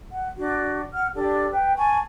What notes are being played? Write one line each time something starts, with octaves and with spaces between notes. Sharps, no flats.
F#5
D4 F#4
F#5 F6
D4 G4 A4 D5
B4 G5
G#5 A5 C#6